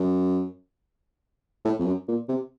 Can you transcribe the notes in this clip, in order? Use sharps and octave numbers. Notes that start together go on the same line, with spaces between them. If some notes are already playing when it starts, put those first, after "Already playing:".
Already playing: F#2
A2
F2
F#2
A#2
C3